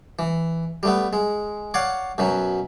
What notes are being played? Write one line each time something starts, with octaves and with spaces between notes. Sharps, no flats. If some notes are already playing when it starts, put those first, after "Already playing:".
E3
G3 A3 B3
G#3
C#5 D5 F5 F#5
F#2 B2 F#3